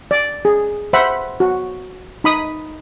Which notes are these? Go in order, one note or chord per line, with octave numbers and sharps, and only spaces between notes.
D5
G#4
C5 E5 F#5 B5
F#4
D#4 B5 D#6